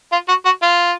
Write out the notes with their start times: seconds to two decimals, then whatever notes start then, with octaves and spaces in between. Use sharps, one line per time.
0.12 F4
0.28 F#4
0.45 F#4
0.62 F4